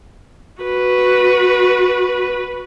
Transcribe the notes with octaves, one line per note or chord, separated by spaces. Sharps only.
F#4 B4